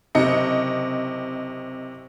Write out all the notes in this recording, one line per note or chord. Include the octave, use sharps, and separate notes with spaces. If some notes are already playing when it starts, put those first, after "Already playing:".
F#1 C3 D#5 C#7